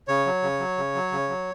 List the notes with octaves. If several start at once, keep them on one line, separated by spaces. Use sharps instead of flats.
C#3 C#5
F#3
C#3
F#3
C#3
F#3
C#3
F#3